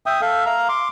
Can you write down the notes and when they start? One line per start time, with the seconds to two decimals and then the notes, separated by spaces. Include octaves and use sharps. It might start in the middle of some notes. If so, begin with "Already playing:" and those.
0.06 E5 G5 D#6
0.21 A4 E5 F5
0.46 F5 A#5
0.69 C6 D6